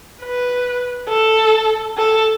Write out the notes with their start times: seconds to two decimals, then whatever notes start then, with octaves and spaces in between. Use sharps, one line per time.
0.22 B4
1.09 A4
1.98 A4